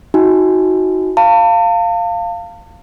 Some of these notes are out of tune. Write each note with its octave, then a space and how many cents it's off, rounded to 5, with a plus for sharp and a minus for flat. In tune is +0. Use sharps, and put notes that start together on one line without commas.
D#4 +35 F#4 +0 G#5 -10
F5 +0 A5 +40